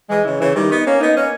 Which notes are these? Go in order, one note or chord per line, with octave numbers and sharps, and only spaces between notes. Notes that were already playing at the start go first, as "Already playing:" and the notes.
E3 G#3
C#3 E3
C#3 E3
D#3 G3
B3 D#4
A#3 C#4
B3 D#4
A#3 C#4